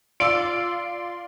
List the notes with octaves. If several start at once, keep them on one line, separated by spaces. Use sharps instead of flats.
F4 D5 C6 E6 D7